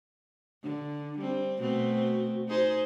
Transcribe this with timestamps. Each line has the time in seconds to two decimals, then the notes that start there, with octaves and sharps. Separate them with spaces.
0.64 D3 D4
1.19 G3 C4
1.59 B2 A3 C4 F#4
2.48 D#4 G#4 C5